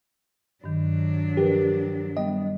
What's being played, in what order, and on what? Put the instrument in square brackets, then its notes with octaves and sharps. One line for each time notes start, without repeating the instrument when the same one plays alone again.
[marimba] G2 D#3 [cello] F#3 D4
[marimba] F3 A#4 B4 [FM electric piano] G4
[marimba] G3 B3 G5 [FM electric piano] D#5